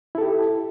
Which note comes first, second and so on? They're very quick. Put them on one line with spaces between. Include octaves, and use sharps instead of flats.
E4 A4 G4